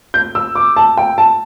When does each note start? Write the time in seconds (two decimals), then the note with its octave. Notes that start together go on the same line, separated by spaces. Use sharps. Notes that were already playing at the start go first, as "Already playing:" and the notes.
0.14 G6
0.35 E6
0.55 D6
0.76 A5
0.97 G5
1.18 A5